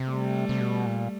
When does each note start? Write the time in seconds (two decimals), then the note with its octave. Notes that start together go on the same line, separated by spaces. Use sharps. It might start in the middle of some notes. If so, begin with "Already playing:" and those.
Already playing: C3
0.09 G3 A3
0.49 C3
0.60 B2
0.85 A#2